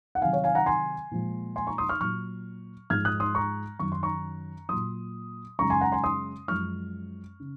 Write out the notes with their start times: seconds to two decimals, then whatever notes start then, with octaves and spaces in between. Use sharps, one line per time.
0.15 F#5
0.21 C3 D#3 F#3 F5 G#5
0.33 C#5 F5
0.44 F5 G#5
0.55 F#5 A#5
0.66 G#5 C6
1.11 A#2 F3 G#3
1.56 G#5 C6
1.67 A#5 C#6
1.78 C6 D#6
1.89 C#6 F6
2.01 A#2 F#3 C#6 F6
2.90 G#2 F3 G#3 F6 G#6
3.05 D#6 F#6
3.20 C6 D#6
3.35 A#5 C#6
3.79 F#2 D#3 F#3 C#6
3.92 C6
4.03 A#5 C#6
4.69 A#2 F#3 C6 D#6
5.59 F#2 C#3 G#3 A#5 C#6
5.70 G#5 C6
5.81 F#5 A#5
5.92 G#5 C6
6.04 C6 D#6
6.48 F#2 F3 G#3 C#6 F6
7.40 C#3